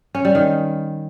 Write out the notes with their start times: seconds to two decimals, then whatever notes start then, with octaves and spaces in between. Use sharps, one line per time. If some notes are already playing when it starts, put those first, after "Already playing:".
0.15 C#4
0.25 G3
0.35 D#3